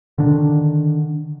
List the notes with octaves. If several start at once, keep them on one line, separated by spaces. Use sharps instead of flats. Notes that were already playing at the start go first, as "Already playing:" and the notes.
D3 D#3 D4